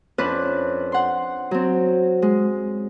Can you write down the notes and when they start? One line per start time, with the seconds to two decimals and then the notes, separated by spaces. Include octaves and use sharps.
0.18 F2 C#4 D4 B4 F#6
0.92 F#5 C6
1.51 F#3 C4
2.22 G#3